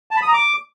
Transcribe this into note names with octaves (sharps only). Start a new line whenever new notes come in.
A5
B5
D#6
A#5
D6